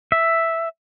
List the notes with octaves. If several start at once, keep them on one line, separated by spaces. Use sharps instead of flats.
E5